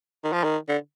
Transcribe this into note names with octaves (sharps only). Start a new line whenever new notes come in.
D#3
F3
D#3
D3